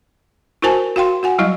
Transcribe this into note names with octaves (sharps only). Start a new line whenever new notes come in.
E4 F#4 A#4 C5 G#5 A5
F#4 F5 G5 C6
F#4 F#5 G#5
F#3 G3 E4 D#5